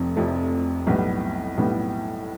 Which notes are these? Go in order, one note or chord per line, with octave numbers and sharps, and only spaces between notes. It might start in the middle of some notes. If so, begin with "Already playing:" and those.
Already playing: F1 F2 C3 F3 A3
F1 F2 C3 F3 A3
B1 A2 G3 B3
B1 A2 G3 B3